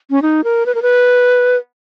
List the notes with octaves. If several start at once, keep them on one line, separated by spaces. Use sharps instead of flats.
C#4
D#4
A#4
B4
A#4
B4